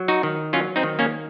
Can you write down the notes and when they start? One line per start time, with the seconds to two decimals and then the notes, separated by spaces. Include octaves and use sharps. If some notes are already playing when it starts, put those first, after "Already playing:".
Already playing: F#3
0.08 D#4 F#4
0.23 D#3
0.53 F#3 C#4 F4
0.76 C4 D#4
0.83 D#3
0.99 A#3 C#4